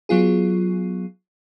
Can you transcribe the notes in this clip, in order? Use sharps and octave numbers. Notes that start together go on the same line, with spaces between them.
F#3 B3 F4 G#4